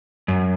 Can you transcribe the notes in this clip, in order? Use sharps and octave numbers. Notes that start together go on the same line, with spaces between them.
F#2